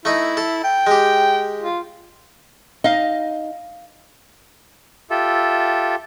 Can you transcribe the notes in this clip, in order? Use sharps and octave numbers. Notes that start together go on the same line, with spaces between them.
A3 D#4 E4
A4
G5
G#3 G4
F4
D#4 D#5 F5
F4 G4 A4 E5